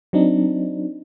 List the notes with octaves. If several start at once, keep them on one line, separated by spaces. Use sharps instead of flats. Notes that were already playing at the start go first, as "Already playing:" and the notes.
F#3 C4 D4 D#4